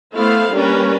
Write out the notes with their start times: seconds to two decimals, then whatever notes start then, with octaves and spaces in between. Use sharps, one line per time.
0.13 A3 B3 E4 A4 C5 F5
0.53 G3 A#3 C#4 D4 A#4 B4